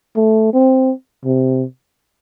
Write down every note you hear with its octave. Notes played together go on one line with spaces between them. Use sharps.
A3
C4
C3